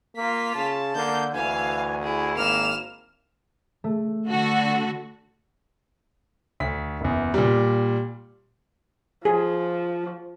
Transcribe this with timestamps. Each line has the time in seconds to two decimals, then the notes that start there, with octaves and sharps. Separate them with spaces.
0.17 A#3 F4 B6
0.55 C#3 A5
0.96 D3 A#3 G6
1.35 D2 E3 F5 G#5
2.03 E4 G#4
2.37 G#1 A#3 F6 E7
3.84 A3
4.27 D3 F#4 A4
6.60 D2 B6
7.01 F#1 E2
7.34 A#2 G3
9.25 F3 G#4